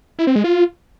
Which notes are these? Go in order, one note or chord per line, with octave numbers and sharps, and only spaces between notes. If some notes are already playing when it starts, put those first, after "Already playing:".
E4
C4
G#3
F4